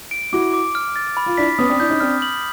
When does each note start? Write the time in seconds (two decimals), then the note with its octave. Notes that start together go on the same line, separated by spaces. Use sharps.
0.11 D7
0.33 E4 F#4 D6
0.54 D6
0.75 F6
0.96 A6
1.17 B5
1.26 F4
1.37 D4 E4 B6
1.59 B3 C#4 D#6
1.69 C4 D4
1.80 D4 E4 G6
1.90 C#4 D#4
2.00 C4 D4 F6
2.22 F#7